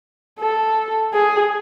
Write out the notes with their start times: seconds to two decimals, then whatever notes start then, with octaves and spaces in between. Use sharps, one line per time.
0.40 A4
1.14 G#4